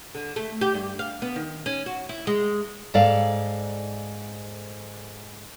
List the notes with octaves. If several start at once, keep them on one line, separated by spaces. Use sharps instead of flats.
D3
A3
G4
G2
F5
B3
D#3
C#4
F#4
E4
G#3
G#2 A4 D5 F5